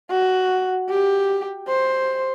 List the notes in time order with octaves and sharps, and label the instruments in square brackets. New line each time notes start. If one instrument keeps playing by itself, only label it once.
[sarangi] F#4
G4
C5